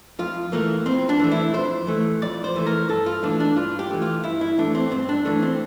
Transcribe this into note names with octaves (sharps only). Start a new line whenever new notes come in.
F2 F4
E3 A3 A#3
F2 C4
D4
E3 A3
E4
F2 C5
E3 A3
F2 D5
C5
E3 A3
A#4
G2 A4
F4
E3 A3 D4
D4
G2 F4
G4
E3 A3
F4
G2 E4
E4
E3 A3 D4
C4
G2 C4
D4
E3 A3 D4
C4